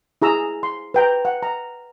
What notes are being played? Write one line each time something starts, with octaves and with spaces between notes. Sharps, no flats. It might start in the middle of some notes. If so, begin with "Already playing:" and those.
E4 G#4 A#5 E6
C6
B4 G5 A#5
F#5
A#5